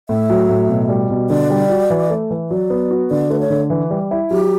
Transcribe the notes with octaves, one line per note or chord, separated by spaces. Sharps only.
A2 E5
F#3
A2
B2
G3
B2
D3 D5
G3
F#4
E3
A3
E3
F#3 D5
B3
F#4
D3 D5
A3 B4
C#5
D3
E3
G3
E4
F#3 G4